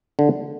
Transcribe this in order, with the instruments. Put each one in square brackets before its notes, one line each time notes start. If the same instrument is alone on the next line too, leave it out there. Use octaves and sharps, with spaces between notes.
[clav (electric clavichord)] D3